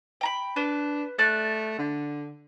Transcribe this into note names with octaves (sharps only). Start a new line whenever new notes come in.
G5 A#5 B5
D4 B4
A3 D5 F#6
D3